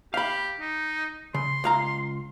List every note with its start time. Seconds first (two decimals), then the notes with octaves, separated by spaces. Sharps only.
0.14 G4 F5 B5
0.60 D#4
1.34 C#3 C6
1.64 C#2 F5 A#5